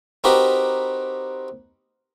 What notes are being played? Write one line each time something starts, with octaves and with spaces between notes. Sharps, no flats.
C4 D#4 F#4 G4 A#4 B4